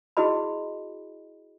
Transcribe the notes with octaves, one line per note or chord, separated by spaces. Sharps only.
E4 F#4 G#4 D#5 B5